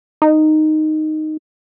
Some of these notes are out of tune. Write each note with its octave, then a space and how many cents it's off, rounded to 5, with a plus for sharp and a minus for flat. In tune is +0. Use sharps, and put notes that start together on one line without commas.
D#4 -5